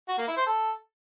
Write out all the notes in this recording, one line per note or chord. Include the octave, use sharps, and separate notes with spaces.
F#4
A#3
E4
C5
A4